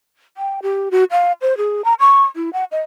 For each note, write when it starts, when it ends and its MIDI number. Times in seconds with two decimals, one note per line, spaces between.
0.37 0.60 79
0.62 0.89 67
0.91 1.04 66
1.11 1.32 77
1.42 1.57 72
1.57 1.84 68
1.84 1.94 82
2.00 2.23 85
2.36 2.50 64
2.53 2.64 78
2.72 2.81 75